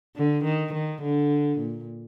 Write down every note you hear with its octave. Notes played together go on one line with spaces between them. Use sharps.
D3
D#3
D#3
D3
A#2